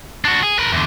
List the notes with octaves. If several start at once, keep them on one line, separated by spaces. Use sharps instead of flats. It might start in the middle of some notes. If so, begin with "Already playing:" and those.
D4 F#4
G#4
A#4 B4
E2 D3